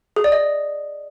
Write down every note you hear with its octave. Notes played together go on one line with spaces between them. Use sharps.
G#4
D5
D#5